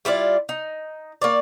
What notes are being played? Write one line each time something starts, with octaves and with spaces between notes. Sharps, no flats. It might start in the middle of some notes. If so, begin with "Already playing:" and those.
G3 E4 F4 D5
D#4
A#3 C#5 D5